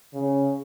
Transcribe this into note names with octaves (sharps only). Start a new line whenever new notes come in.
C#3